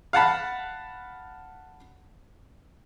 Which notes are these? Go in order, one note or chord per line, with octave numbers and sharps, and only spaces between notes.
F5 F#5 A5 B5